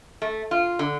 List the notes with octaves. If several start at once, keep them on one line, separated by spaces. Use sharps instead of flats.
A3
F4
D3